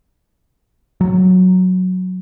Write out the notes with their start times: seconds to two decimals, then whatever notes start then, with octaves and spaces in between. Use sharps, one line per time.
1.01 F#3